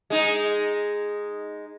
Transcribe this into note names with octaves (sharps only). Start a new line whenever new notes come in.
G#3 D#4